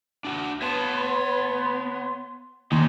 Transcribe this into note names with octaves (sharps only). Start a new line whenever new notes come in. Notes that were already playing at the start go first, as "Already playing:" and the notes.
D4 F#4
B3 C#5 F5 A5 C6
D#2 G3 C#4 D#4 A#5 C6